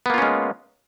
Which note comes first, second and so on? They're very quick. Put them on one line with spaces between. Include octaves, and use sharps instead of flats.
B3 A#3 F4 C#4 G#3